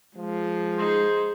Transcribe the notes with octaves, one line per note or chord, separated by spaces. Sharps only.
F3 G#3
D#4 G#4 C5